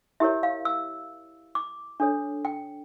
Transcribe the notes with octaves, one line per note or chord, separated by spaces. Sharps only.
E4 G4 A#4 C#5 E5
F5
E6
D6
D4 A4 C#5
G5